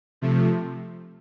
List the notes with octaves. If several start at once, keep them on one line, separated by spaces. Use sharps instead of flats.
C3 F3 A3